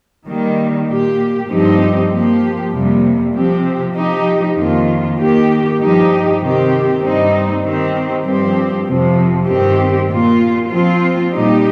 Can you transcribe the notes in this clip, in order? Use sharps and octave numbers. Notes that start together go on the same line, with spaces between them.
D#3 G3 A#3
A#2 A#3 G4
G2 F3 C4 D#4 G4
F3 A#3 G4
F2 C3 G3 A#3
C3 F3 C4 G4
F3 D#4 G4
F2 D#3 A#3 F4
D#3 A#3 G4
G2 F3 D#4 G4
C3 D#3 C4 G4
G2 G3 C4 D#4
D#3 C4 G4
G2 F3 C4 G4
F2 C3 F3
G2 D#3 C4 G4
A#2 A#3 F4
F3 C4 F4
A#2 G3 D#4 G4